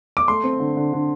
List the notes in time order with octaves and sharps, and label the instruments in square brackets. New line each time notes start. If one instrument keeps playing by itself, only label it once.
[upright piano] D6
A3 C6
C4
D3
D3
D3